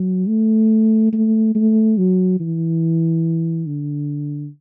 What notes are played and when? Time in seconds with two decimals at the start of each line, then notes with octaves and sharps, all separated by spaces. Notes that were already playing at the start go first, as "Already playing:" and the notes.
Already playing: F#3
0.28 A3
1.13 A3
1.55 A3
1.98 F#3
2.40 E3
3.66 D3